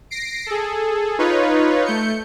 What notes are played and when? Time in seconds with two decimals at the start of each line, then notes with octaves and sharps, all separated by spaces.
0.10 A#6 C7 D7
0.46 G#4 A4
1.19 D#4 F4 B4 C#5
1.85 A3 G6 C#7